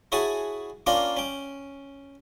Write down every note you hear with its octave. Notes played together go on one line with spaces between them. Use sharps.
E4 F#4 G#4 C#5 G#5 A5
A#3 C#4 D4 F4 A#4 F5
C#4 G5